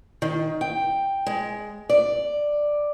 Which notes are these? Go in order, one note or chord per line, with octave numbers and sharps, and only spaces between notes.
D#3
G5
G#3
D5